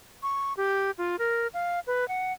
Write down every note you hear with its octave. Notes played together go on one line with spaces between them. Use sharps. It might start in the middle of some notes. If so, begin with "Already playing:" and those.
C#6
G4
F4
A#4
F5
B4
F#5